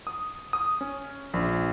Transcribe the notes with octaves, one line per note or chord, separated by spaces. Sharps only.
D#6
D#6
C#4
A#1